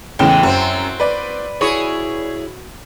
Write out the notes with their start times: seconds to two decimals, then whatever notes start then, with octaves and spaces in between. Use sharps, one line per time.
0.19 A1 E2 A2 C#3 E3 G#3 G5
0.43 F#2 C4 F#4 F#6
1.00 B4 D5
1.61 E4 F#4 G#4 C#5